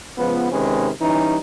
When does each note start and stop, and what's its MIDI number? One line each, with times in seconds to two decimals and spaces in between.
0.18 0.48 37
0.18 0.48 53
0.18 0.48 59
0.52 0.90 48
0.52 0.90 51
0.52 0.90 56
0.52 0.90 61
0.52 0.90 71
1.01 1.37 52
1.01 1.37 55
1.01 1.37 61
1.01 1.37 63